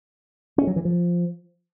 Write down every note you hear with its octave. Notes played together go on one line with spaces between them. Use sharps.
C#4
F#3
E3
F3